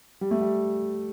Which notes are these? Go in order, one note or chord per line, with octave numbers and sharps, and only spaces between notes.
G3
A3
G3